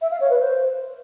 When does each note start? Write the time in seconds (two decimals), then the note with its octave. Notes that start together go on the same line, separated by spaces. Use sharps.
0.01 E5
0.11 F5
0.20 C#5
0.30 B4
0.39 C5